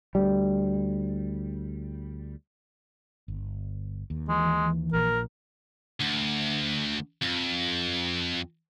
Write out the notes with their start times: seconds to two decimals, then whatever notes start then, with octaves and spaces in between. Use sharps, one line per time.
0.15 D2 G3
3.28 G1
4.10 D#2
4.28 E3 G#3
4.93 A#1 A#2 A#4
6.01 D2
7.22 F2